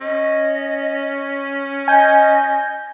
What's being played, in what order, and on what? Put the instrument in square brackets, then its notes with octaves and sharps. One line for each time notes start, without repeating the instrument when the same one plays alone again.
[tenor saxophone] C#4 [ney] D#5
[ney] D#5 [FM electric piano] G#5 G6